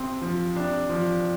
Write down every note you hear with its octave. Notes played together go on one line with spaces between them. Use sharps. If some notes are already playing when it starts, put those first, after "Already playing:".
Already playing: C3 C4
F3
C3 D4
F3